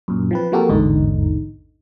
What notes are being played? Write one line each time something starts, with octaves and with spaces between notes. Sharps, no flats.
F#2 A#2
F3 C4 B4
F3 A#3 F#4 G4 A4 A#4
A1 E2 G#2 D3 D#4